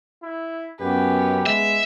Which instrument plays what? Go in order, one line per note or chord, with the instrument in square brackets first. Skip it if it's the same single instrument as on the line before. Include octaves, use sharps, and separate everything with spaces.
[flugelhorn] E4
[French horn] F#2 [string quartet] B3 C#4 B4 [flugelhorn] G4
[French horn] G#3 [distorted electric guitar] E5